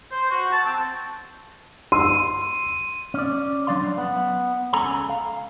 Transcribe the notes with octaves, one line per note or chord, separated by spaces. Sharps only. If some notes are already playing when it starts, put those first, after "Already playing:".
C5
F#4
A5
C4
C6 E6 D#7
C#4 D5
F#3 D4 D5 F5 C6
B3 F#5
C#2 C#3 A4 G#5 A#5 B5
F5